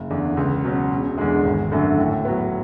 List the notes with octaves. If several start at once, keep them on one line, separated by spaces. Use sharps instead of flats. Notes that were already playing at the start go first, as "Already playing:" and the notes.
Already playing: F#1
E2 D3
C#2
B2 F#3 C#4
E1
E2 D3 G#3
G#1
F#2 D3 A3
A2
F#3 B3